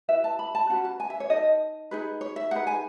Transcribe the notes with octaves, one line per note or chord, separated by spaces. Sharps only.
E4 B4 E5
A5
B5
A5
C#4 F#4 B4 F#5
A5
G#5
E5
C#5
D#4 A4 D#5
D#4 G#4 B4
C#5
E5
D#4 G#4 B4 F#5
G#5